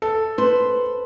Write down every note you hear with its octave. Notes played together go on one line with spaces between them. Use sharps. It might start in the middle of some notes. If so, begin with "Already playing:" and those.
A4
B4 C5